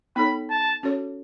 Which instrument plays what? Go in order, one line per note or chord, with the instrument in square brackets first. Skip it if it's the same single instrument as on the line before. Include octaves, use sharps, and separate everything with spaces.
[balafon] B3 D#4 A4 C#5 [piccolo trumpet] B5
[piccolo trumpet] A5
[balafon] C#4 F#4 A4 C#5